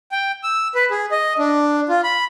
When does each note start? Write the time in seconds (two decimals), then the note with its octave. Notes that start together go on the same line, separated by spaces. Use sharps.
0.12 G5
0.43 E6
0.75 B4
0.91 G#4
1.11 D#5
1.39 D4
1.89 F4
2.04 B5